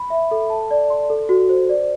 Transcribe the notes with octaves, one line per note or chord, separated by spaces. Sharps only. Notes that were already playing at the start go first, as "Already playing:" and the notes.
Already playing: B5
E5
A4
A5
D5
C6
A4
F#4
C5
D5